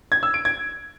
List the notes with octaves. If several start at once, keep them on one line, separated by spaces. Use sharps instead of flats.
G#6
E6
D7
G#6